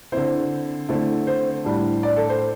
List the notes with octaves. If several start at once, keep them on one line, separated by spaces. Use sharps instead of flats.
D3 C4 E4 C5
D3 A3 C4 E4
C5
A2 G3 D4
D5
A4
C5